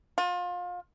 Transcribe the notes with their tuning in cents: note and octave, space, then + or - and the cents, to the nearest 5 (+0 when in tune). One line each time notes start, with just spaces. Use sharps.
F4 +30